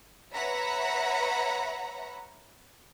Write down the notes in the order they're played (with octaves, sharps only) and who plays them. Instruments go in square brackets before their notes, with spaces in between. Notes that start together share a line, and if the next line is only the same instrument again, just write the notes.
[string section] B4 C#5 E5 F#5 A#5 B5